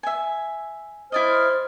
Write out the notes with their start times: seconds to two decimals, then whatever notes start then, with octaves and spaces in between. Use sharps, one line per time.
0.03 E5 G#5
1.12 E4 C5 D5 D#5 F6